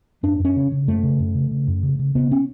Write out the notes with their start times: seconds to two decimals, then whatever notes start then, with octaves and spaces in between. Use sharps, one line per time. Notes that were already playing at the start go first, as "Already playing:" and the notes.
0.23 F#2 D4
0.40 F#2 C#4
0.56 C#3
0.72 C#3
0.88 F#2 A3
1.03 C#3
1.19 F#2
1.35 C#3
1.51 C#3
1.68 F#2
1.83 C#3
1.99 C#3
2.15 C#3 B3
2.31 C#4